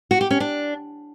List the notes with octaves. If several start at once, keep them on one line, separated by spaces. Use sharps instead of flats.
F#4
G4
C#4
D4